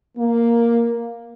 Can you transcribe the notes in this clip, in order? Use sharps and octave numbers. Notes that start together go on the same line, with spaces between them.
A#3